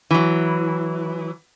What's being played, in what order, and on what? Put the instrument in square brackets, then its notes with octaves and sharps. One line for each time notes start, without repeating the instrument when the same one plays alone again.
[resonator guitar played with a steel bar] E3 F#3